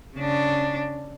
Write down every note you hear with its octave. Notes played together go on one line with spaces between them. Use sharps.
C#3 D4